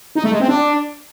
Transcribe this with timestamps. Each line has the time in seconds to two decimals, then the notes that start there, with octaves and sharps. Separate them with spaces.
0.15 D#4
0.24 A3
0.32 G#3
0.40 C4
0.48 D4